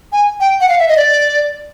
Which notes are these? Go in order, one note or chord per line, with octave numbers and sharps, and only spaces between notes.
G#5
G5
F#5
F5
E5
D#5
D5